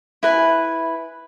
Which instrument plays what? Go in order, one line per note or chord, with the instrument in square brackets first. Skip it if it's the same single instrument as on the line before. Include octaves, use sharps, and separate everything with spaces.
[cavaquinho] E4 B4 G#5